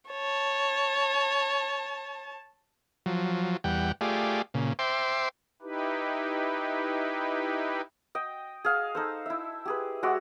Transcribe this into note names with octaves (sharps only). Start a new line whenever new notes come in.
C#5 A5
F3 F#3
E2 G3 F#5 G5
A3 F4 G4 G#4 D5
A#2 C#3
C5 E5 G5 C6 D6
D#4 E4 G4 B4
D#5 G5
G#4 F5
D#4 A4 C5
E4 E5
G4 G#4 B4
G#3 F#4 D5 E5